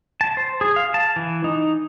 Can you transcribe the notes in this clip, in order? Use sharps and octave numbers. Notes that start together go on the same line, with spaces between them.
A5
C5
G#4
F5
A5
E3
D#4